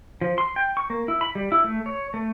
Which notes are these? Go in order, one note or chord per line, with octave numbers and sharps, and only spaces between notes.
F3
C6
G5
C#6
A#3
E4
B5
G3
E4
A3
C#5
A3